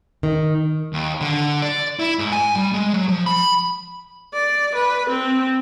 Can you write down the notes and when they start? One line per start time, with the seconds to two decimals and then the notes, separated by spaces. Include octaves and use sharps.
0.23 D#3
0.93 D#2
1.21 D3
1.62 D5
1.99 E4
2.19 G#2
2.32 G#5
2.56 G3
2.73 G#3
2.94 F#3
3.09 F3
3.26 B5
4.33 D5
4.75 B4
5.09 C4